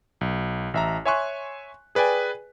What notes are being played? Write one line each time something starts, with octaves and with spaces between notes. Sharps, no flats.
B1
A1 E5 A#5
C#5 E5 G#5 C6 C#6 F#6
G#4 B4 D5 G5 G#5